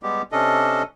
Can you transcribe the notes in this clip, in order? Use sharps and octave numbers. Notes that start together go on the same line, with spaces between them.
G3 G#3 B3 G4
C3 C#4 D4 A4 D#5